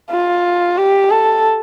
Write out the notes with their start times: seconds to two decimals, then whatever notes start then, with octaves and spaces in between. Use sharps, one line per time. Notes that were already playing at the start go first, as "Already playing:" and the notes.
0.11 F4
0.77 G4
1.11 A4